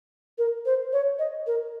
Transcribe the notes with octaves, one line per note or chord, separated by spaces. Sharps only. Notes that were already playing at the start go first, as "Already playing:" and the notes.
A#4
C5
C#5
D#5
A#4